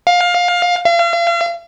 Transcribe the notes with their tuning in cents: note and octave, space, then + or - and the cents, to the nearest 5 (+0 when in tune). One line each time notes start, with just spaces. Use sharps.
F5 +20
F5 -40